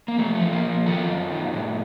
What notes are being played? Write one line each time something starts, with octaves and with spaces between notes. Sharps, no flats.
A#3
F3 A3
A3
F3
A#3
F3
A#3
D#3 F4 A4
F#2
D#3
A2